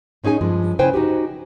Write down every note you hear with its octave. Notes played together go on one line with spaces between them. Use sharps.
A2 C#4 D#4 G#4 G#5
G2 F3 G#3
C#3 E4 B4 C5 G5 G#5
D#4 F#4 G4